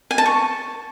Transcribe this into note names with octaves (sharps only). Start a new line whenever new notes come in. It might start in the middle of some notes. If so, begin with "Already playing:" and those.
G#5
A5
C#6